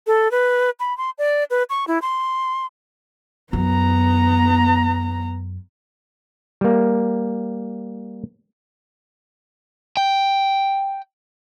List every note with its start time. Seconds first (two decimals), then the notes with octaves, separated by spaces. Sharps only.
0.07 A4
0.31 B4
0.80 B5
0.98 C6
1.18 D5
1.50 B4
1.70 C#6
1.87 E4
2.02 C6
3.53 F#2 B3 A#5
6.61 G3 A#3
9.97 G5